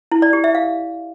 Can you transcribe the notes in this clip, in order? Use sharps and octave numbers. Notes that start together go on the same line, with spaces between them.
E4
D5
G4
E5
F5